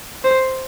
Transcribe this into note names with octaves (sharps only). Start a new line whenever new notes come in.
C5